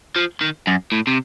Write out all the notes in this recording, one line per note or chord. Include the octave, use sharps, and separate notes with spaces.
F3
D#3
F#2
A2
C3